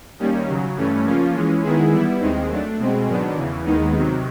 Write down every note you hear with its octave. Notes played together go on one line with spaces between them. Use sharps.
D#2 D#3 G3 A#3 C#4
D#2 C#3 F#3
G2 E3 A3 C#4
C#3 F3 A#3 C#4 F4
E3 G#3 C#4
D#3 G#3 B3 E4 G#4
E3 G3 B3 E4
D#2 D#3 G#3 C4 D#4
F#3 A3 D4
B2 G#3 C4
G#2 D#3 F#3 B3 D4
E2 C#3 E3
D#2 D#3 G#3 B3 D#4
C3 D#3 F#3